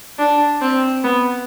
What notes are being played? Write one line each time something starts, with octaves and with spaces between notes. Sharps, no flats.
D4
C4
B3